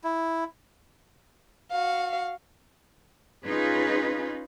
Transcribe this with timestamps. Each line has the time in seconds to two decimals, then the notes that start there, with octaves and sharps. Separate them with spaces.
0.04 E4
1.71 F#4 F5
3.45 C#4 D#4 F4 G#4 B4